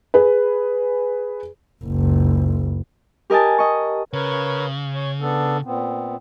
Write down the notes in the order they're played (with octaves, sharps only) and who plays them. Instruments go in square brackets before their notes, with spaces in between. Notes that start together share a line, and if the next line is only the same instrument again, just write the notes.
[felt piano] G#4 B4
[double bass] F#1 C#2
[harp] G4 A#4 D#5 G#5 A5
D#5 C#6
[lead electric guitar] C#3 [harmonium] A#4 B4 C#5
[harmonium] C#5
B3 D4 A4
A#2 B3 C4